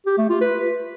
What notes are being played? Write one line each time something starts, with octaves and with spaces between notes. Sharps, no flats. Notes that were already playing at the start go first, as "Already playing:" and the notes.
G4
A3
F4
B4